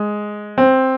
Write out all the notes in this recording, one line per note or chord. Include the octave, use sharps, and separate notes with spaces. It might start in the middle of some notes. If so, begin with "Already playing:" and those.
Already playing: G#3
C4